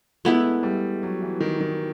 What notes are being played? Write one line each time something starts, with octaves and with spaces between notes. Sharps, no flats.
G#3 A3 B3 E4
G3
F#3
E3
D#3
D#3